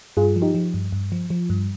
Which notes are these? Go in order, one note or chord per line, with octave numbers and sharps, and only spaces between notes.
G2 F4 G#4
F3
D#4 G4
F3
G2
G2
F3
F3
G2